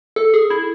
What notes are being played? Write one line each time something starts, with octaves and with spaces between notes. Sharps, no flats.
A4
G#4
E4